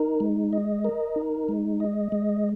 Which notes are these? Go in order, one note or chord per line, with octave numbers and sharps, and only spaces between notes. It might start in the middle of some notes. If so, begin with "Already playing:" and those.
Already playing: D#4 A#4
G#3
D#5
A#4
D#4
G#3
D#5
G#3